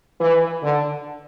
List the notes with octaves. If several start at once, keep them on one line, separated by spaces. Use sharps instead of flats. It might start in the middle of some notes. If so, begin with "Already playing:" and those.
E3
D3